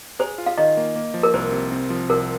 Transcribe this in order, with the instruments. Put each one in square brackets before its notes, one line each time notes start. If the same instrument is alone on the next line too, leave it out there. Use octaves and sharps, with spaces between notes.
[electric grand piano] G#4 [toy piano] C5
[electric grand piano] F4
[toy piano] F5
[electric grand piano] D#3 [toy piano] D#5
[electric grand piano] A#3
A#3
F3
[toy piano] A#4
[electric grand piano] C2 [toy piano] C5
[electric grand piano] C3
C4
F3
[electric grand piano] C2 [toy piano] A#4